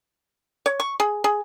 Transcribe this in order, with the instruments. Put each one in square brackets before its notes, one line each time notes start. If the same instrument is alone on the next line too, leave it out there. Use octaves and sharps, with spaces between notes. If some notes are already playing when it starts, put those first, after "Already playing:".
[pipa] C#5
C#6
G#4
G#4